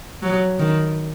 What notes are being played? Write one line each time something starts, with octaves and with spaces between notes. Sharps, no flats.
F#3
D#3